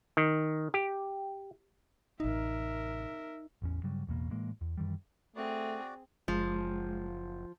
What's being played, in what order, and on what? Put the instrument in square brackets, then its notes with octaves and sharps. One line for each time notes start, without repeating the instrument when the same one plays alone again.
[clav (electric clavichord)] D#3
G4
[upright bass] A1 C3 [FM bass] D#4 [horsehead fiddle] A#4 E5
[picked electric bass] A1 E2 C#4
G2 C#3 F#3 G3
A1 E2 B2 A#3
A2 E3 G#3 A#3
E2
F#2 D#3 E3 G3
[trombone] A3 [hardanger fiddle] C4 G#4 [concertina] F#4 D5
[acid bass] F#1 [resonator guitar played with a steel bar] F3 [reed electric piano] G#3